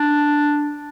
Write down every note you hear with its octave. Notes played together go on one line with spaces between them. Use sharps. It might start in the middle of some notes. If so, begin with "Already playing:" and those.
Already playing: D4